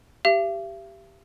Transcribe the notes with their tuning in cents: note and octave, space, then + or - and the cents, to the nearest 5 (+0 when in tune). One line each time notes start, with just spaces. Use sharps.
G4 +0 E5 +45